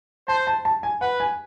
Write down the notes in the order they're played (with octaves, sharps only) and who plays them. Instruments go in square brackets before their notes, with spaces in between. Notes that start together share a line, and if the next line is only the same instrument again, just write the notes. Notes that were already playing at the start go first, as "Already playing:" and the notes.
[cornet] C5 [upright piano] A5
[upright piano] A5
A5
G#5
[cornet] B4 [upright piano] F#5
[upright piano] G#5